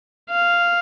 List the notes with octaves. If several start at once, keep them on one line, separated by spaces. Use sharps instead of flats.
F5